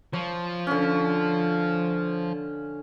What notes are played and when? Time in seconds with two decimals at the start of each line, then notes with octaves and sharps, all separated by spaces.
0.13 F3 C#5
0.67 D3 C#4